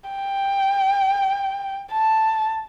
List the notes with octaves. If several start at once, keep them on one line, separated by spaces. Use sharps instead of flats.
G5
A5